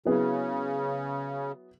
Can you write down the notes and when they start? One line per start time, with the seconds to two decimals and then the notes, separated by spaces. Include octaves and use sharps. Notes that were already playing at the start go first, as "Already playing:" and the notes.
0.05 C#3 F#3 B3 E4 G#4 B4